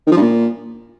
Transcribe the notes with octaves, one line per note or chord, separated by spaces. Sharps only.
D#3
F3
G2
A#2